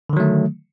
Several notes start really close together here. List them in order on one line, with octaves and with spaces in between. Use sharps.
D3 D#3 F#3 A3